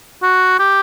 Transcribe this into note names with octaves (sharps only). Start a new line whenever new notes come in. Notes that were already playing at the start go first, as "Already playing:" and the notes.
F#4
G4